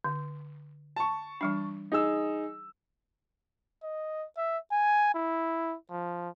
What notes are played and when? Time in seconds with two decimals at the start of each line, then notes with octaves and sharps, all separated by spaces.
0.04 D3
0.96 A5 C#6
1.41 E3 G3 D4
1.92 D#4 G#4 E6
3.83 D#5
4.37 E5
4.72 G#5
5.15 E4
5.91 F3